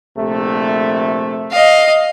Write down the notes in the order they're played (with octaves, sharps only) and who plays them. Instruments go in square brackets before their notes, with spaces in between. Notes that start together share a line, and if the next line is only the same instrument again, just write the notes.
[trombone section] A#1 C3 A3
[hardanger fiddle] D#5 F5